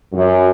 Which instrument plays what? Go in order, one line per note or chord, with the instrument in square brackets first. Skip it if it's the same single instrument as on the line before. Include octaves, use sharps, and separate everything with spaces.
[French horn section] F#2